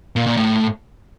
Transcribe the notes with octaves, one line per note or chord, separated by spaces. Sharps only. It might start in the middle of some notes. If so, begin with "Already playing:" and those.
A#2
A#2
A2